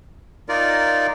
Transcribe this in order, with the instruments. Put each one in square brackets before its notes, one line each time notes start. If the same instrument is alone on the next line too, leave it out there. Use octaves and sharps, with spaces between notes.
[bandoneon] D#4 F4 A#4 D5